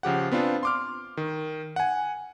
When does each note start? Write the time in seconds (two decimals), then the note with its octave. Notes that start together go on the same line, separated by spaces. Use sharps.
0.03 C#3 F3 G4 F#5
0.32 B3 C4 D4 F4
0.63 C6 D6 F6
1.17 D#3
1.76 F#5 G#5